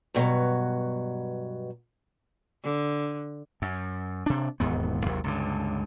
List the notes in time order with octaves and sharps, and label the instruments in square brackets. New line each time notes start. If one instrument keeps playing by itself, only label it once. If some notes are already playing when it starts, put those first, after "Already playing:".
[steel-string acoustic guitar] G2 B2 F3 F#3
[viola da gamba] D3
[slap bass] F#2
C3 D4
E1 D#2 G#2 B3
G#1 D#2 C3 F#3
C#2 G2 D3